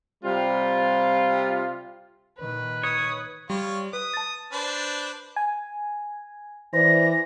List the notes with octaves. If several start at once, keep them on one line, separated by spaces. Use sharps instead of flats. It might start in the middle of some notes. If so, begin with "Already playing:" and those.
C3 G3 C4 F4
A#2 D#3 B4
C#5 D#6
G3 F4 C#5
B4 D#6
A5 A6
D4 B4 C5
G#5
E3 C5 D5 A#6